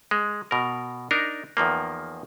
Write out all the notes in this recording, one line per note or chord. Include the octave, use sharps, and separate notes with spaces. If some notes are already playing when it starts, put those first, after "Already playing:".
G#3
B2 A#4
D4 D#4 A#4
E2 D#3 F3 A#3